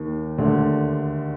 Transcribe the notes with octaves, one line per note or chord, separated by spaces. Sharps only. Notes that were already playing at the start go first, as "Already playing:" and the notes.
Already playing: D#2 D#3
D2 D3